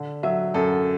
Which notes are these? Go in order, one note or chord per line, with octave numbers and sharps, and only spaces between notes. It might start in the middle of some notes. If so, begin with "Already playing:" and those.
Already playing: D3
F#3 E5
F#2 A4